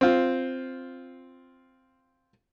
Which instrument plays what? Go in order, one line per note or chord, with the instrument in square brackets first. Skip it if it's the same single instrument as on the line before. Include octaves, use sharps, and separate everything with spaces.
[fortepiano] C4 F4